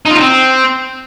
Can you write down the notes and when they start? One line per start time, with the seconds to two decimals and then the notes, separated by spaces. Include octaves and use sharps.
0.06 D#4
0.11 F4
0.16 D#4
0.21 C4